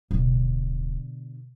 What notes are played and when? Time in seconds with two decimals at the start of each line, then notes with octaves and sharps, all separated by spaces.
0.11 D1 B2 D3